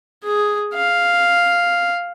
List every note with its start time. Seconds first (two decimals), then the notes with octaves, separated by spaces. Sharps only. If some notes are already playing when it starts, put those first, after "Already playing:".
0.24 G#4
0.74 F5